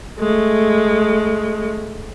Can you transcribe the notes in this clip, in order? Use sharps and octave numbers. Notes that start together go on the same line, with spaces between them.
G#3 A3